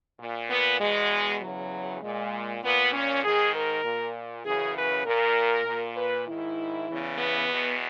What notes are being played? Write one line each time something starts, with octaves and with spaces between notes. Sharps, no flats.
A#2
B3
E2 B2 G#3
E2 C#3 E3 F#3
A#2 G#3
A#2 B3
C#4
G#2 D#3 G#4
A#4
A#2
F#2 C#3 E3 G#4
B4
A#2 A#4
A#2
B4
G#2 D#3 E4
E2 C#3 E3
B3
E2 B2